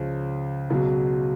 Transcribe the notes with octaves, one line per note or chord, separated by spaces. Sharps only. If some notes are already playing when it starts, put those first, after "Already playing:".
Already playing: C#2 C#3 F3
C#2 B2 F#3